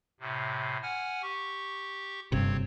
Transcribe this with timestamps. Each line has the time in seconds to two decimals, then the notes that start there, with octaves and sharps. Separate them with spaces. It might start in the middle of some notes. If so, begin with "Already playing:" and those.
0.20 A2 C3
0.82 F#5 G#5 F6
1.22 G4 C#6
2.32 F#1 G2 C3 C4 C#5